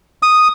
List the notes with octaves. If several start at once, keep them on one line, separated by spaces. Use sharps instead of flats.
D#6